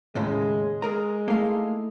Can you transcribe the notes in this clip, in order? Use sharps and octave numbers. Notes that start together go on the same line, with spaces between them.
D#2 A2 C#3 G#3
G#3 G#4 A#4 A#5
A3 A#3 D#4 E4 F5